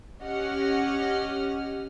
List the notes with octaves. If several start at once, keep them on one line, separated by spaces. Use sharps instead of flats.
C#4 G4 D#5 F#5 F6